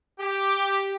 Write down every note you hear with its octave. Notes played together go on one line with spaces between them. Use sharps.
G4